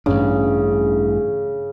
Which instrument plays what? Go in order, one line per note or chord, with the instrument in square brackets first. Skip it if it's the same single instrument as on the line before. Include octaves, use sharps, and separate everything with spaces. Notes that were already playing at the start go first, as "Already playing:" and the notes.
[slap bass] A1 G2 D4 [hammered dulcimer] C#3